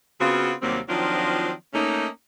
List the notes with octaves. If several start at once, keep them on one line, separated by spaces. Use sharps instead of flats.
C#3 B3 C4 F4 F#4
D#2 C3 F#3 G3 A#3 C4
D#3 F3 F#3 C4 D4 F4
A3 A#3 C#4 D#4